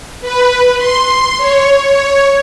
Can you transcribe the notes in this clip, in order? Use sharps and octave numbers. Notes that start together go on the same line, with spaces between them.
B4
C6
C#5
C#5